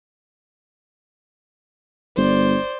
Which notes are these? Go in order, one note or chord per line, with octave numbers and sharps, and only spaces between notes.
G1 C5 D5